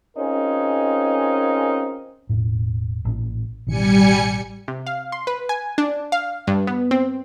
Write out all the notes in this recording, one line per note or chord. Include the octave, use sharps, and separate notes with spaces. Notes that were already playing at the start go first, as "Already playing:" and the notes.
C4 C#4 D#4 F4 G#4 A#4
E1 A2
A1 A#2 A#3
A1 B2 D#3 G3 G#5 C#7
C3
F5
C6
B4
G#5
D4
F5
G2
B3
C4